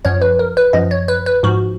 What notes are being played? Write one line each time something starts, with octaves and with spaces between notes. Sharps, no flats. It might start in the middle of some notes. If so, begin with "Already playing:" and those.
F#2 F3 C#5
B4
A#4
B4
F#2 F3 D#5
C#5
B4
B4
G#2 F3 F#4